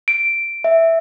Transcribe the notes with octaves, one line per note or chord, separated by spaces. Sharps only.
D7
E5